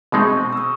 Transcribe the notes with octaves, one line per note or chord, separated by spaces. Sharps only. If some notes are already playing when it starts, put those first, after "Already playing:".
B2 G#3 C4 D#4 C#6 D#6
E6
C#6 D#6